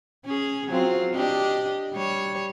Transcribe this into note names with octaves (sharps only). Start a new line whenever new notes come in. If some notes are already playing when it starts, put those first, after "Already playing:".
C#4 G#4
F#3 C4 F4
D4 G4 D#5
G3 C#5